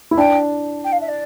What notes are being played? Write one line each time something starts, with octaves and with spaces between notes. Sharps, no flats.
E4
D4 G5
G5
F5
E5
D5